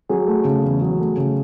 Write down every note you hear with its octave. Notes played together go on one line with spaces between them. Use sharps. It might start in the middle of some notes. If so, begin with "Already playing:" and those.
F#3 G#4
A3
C#3
E2
F#3
A3
C#3